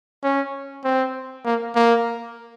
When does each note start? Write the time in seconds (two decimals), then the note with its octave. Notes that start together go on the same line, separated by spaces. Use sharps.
0.23 C#4
0.84 C4
1.45 A#3
1.75 A#3